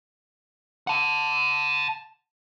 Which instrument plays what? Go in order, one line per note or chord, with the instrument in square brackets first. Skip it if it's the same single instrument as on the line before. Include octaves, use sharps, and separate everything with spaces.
[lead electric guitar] F#5 A5